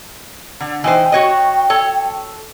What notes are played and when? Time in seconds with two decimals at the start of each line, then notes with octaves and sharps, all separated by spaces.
0.60 D3
0.84 E3 D#4 C5 G5
1.12 F#4 C#5 D#5
1.70 A4 C#5 A5